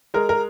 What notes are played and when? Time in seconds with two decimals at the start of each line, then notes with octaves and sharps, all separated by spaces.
0.14 G#3 A#4
0.29 A#4